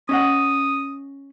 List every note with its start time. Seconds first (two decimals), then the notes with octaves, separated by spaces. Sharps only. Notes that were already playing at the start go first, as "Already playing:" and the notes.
0.09 C#4 D#5 F#5 D#6